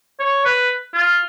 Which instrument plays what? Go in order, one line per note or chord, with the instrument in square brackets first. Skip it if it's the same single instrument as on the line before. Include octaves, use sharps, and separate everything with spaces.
[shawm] C#5
B4
F4